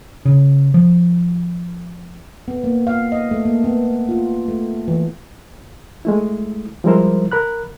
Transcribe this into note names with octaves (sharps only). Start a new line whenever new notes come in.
C#3
F3
B3
A#3
F5
D#5
A3
A#3
B3
F4
A3
E3
G#3 A3 E4
F3 G3 G#3 E4 A#4 C5
A#4 B5 F#6